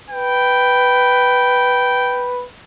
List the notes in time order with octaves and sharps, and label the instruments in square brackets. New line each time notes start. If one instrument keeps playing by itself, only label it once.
[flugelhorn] B4 [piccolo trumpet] G5